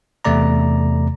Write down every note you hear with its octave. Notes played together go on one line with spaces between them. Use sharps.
E2 C3 A3 D5 A#5